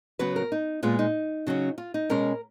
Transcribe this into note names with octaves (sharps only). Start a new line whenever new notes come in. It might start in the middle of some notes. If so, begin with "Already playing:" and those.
C#3 F#3 B3 B4
A#4
D#4
A#2 G#3 B3 F4
D#4
C#3 F#3 C#4
F4
D#4
B2 G#3 C#4 A#4